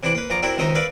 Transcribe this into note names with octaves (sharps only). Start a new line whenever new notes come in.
C3 E3 D4 B5 D6
A#3 B4
A#1 F4 A#5 D6
C4 D4 E4 F#4 A#4
C#2 C3 D#3 D#5 E5 A#5
A#4 B4 D5 E5 F5